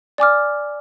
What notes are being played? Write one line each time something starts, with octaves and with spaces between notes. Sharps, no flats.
D5 G#5 D6 F6